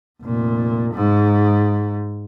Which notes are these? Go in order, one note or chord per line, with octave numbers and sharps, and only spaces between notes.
F1 A#2
G#2